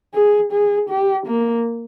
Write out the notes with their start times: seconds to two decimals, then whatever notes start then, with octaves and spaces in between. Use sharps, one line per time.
0.14 G#4
0.52 G#4
0.89 G4
1.26 A#3